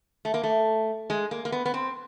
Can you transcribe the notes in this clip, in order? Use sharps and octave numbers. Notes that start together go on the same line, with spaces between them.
A3
A#3
A3
G#3
A#3
A#3
B3
B3
C4